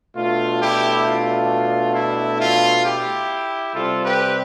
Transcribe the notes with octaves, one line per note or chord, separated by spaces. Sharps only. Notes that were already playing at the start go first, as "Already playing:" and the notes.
B2 A3 D4 F4
E4 G4
F4
E4
F4
E4 G4
C3 G3 C4 F4 A4
G4 B4